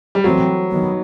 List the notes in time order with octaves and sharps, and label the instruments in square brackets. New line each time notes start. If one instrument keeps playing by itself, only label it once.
[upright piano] G3
[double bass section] E3 A3 C4 [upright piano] F#3
[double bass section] D#3 F#3 B3